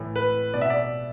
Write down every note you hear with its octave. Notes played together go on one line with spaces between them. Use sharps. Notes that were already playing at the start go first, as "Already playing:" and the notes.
Already playing: A2 E3
B4
B2 D5
E5
D5